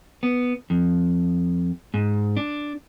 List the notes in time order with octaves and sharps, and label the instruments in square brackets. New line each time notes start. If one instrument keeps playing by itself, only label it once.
[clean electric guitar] B3
F2
G#2
D4